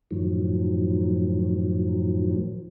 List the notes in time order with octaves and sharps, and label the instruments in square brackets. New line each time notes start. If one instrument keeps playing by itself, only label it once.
[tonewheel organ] F#2 A2 D#3 F3 F#3